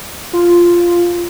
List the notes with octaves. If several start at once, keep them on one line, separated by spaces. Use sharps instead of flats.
F4